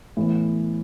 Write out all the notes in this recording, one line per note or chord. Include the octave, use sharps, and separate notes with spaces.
A2 E3 B3